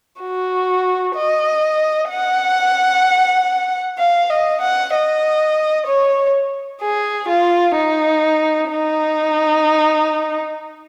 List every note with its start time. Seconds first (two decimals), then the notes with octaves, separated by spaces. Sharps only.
0.21 F#4
1.16 D#5
2.10 F#5
3.98 F5
4.30 D#5
4.61 F#5
4.93 D#5
5.87 C#5
6.82 G#4
7.29 F4
7.76 D#4
8.71 D#4